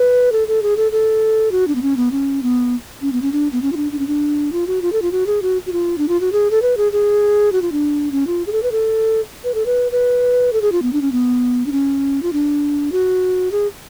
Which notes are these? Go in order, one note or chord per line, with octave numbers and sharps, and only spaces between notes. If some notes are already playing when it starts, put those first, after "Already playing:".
Already playing: B4
A4
A4
G#4
A4
A4
F#4
D4
B3
C#4
B3
C#4
B3
C#4
B3
C#4
D4
B3
C#4
F4
D4
D4
C#4
D4
F4
F#4
F4
A4
F4
F#4
G#4
F#4
F#4
F4
D4
F4
F#4
G#4
A4
B4
G#4
G#4
F#4
F4
D4
C#4
F4
G#4
A4
B4
A4
B4
A4
B4
B4
A4
G#4
F4
B3
D4
C#4
B3
D4
C#4
F4
D4
F#4
G#4